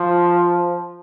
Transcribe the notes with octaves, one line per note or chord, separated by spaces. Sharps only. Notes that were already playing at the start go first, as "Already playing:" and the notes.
Already playing: F3